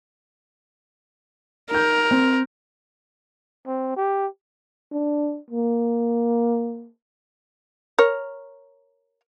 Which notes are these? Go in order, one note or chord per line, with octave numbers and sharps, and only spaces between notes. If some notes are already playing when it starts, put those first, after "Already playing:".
D#4 A#4 G6
C4
C4
G4
D4
A#3
A#4 C#5